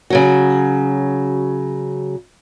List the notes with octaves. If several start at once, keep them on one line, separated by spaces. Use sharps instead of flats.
C#3 F#3 F#4